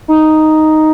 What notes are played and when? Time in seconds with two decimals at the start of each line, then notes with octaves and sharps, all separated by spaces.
0.08 D#4